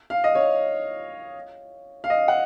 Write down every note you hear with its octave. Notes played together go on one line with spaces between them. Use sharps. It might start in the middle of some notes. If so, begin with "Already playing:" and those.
F5
D#5
C#5
F5
D#5
F#5